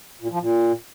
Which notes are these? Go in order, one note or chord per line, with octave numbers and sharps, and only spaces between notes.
A#2
F3
A#2